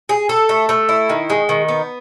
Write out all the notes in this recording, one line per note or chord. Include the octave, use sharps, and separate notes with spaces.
G#4
A4
A3
A3
E4
D#3
G#3
D#3
B3